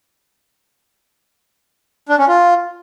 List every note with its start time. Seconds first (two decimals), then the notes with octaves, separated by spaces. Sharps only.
2.09 D4
2.18 C#4
2.28 F4